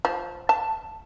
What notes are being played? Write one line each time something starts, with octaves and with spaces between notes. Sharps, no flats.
F3
A5